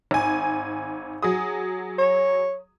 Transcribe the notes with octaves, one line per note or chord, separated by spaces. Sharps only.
G#1 G#5
F#3 G#4 D#6
C#5